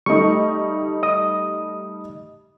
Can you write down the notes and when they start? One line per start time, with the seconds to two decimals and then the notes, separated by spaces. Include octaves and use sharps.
0.06 G3 A3 D#4 C#6
1.03 D#5 D#6